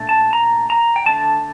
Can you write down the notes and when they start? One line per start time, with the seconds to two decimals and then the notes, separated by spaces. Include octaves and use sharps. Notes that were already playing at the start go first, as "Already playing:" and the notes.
Already playing: A#2 A3 D4
0.09 A5
0.33 A#5
0.70 A#5
0.96 G5
1.06 D3 A3 D4 A5